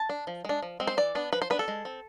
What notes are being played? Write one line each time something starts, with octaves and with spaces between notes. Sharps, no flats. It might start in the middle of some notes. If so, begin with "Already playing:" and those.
Already playing: A5
D4
F3
G#3 D4
F3
G#3 C4
C5
E3 D5
B3 D4
F3 B4
C5
B3 D4 B4
A4
G#3
C4